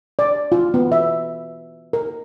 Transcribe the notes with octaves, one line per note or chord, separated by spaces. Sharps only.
D5
F4
B3
E5
A#4